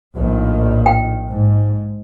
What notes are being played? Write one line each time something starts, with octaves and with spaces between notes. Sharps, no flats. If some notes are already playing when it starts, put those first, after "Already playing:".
A#1 A2 D#3
G5
G#2